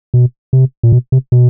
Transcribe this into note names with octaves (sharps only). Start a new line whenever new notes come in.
B2
C3
A#2
B2
C3
B2